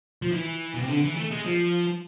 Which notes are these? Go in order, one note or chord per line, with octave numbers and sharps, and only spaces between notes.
F3
E3
B2
C3
D3
E3
A3
G#3
F3